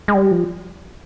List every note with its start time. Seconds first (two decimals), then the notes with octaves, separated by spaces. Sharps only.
0.08 G#3
0.15 G3
0.31 F3